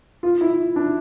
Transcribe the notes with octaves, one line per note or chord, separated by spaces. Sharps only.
F4
E4
D4